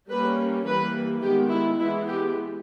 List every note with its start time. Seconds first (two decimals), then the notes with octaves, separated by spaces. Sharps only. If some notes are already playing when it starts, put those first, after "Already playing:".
0.09 G3 A#3 C#4 B4
0.66 E3 G3 A#3 B4
1.22 D#3 G#3 B3 G4
1.50 E4
1.79 E3 G#3 B3 E4
2.07 G4